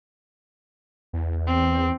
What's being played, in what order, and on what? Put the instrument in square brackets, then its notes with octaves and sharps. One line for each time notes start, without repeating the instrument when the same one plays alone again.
[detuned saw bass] E2
[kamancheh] C4